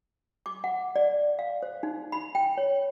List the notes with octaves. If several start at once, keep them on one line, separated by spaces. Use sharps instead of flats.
D6
F#5
D5
F5
C5
D#4
B5
G5
C#5